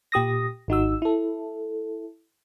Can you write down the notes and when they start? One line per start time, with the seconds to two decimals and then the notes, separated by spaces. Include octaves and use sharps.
0.12 A#2 G4 D#6 A#6
0.68 G#1 D#4 F#4 E6
1.02 E4 A4